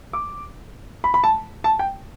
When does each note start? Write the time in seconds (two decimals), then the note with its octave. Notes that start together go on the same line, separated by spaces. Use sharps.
0.13 D6
1.04 B5
1.14 B5
1.24 A5
1.64 A5
1.79 G5